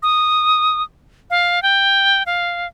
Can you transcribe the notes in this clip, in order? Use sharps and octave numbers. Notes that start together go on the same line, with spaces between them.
D#6
F5
G5
F5